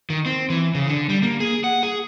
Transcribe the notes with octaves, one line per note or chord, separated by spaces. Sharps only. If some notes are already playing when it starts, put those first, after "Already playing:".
D#3
C4
E3
C#3
D3
G3
A#3
G#4
F#5
G#4